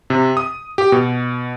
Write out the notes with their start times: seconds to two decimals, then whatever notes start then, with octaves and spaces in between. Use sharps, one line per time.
0.10 C3
0.37 D#6
0.78 G4
0.92 B2